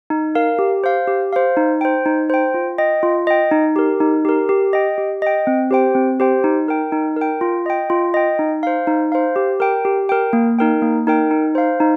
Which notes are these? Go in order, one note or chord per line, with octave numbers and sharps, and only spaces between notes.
D#4
A#4 F5
G4
C5 F5
G4
C5 F5
D#4
C5 G5
D#4
C5 G5
F4
D#5 G5
F4
D#5 G5
D#4
G4 A#4
D#4
G4 A#4
G4
D#5 G5
G4
D#5 G5
C4
G4 C5 G5
C4
G4 C5 G5
D#4
A#4 G5
D#4
A#4 G5
F4
D#5 G5
F4
D#5 G5
D#4
C5 F5
D#4
C5 F5
G4
A#4 G5
G4
A#4 G5
A#3
D#4 A#4 G5
A#3
D#4 A#4 G5
D#4
C5 F5
D#4